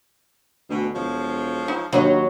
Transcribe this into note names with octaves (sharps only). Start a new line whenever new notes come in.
D2 B2
E1 F3 G#3 C#5
D#4
D#2 F#3 D4 D#4 D#5